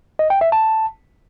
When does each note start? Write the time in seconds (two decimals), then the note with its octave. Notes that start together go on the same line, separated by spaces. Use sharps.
0.19 D#5
0.30 G5
0.41 E5
0.52 A5